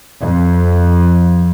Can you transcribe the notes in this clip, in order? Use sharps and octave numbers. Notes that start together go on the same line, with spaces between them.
F2